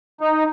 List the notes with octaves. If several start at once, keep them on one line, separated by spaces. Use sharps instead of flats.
D#4